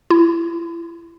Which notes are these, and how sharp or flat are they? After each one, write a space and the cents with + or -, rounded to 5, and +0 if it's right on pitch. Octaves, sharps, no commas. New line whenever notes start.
E4 +35